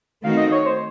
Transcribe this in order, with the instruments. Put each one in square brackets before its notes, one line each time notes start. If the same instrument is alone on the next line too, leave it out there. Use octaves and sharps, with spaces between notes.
[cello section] D#3 A3 C4 D#4 F#4 [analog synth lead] F5
[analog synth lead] D#5
C#5
C5